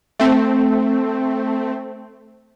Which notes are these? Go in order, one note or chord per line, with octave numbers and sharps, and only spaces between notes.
A3 C4